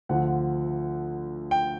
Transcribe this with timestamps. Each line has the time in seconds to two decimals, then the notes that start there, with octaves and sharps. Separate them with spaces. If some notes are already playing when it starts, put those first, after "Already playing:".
0.09 D2 D3 F3 F#5
1.51 G5